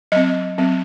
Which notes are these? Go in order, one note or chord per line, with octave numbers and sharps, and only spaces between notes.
F#3 C4 D#5
F#3 C4